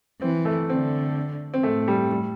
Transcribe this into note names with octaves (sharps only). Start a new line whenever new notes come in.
E3 C4
A3
D3 C4
C4
A2 A3
G3
G3